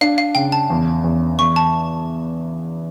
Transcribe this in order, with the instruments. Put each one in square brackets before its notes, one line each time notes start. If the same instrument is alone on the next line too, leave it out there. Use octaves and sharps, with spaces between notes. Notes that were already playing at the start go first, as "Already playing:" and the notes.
[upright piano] D4 [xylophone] F5
[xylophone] F5
[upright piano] C#3 [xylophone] G5
[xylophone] A5
[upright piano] E2
E2
[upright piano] E2 [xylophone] C#6
[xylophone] A5